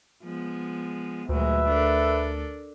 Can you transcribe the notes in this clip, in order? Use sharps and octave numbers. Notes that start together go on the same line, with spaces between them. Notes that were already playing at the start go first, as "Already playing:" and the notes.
F3 G#3 B3
D2 A#2 F#3 G#3 B4 E5
D4 A4 A#4